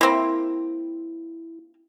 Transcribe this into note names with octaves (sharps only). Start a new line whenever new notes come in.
A#3 C4 E4